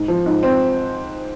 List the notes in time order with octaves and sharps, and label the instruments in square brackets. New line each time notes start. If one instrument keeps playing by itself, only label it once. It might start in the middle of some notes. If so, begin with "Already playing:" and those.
Already playing: [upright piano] G#2
F3
G#2
C4